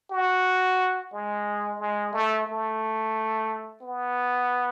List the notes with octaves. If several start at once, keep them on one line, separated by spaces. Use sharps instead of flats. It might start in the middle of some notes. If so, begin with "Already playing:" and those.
F#4
G#3
G#3
A3
A3
B3